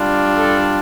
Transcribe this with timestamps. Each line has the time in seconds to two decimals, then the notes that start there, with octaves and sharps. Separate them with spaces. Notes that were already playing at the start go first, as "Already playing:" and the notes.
Already playing: G3 D4 F4
0.37 A4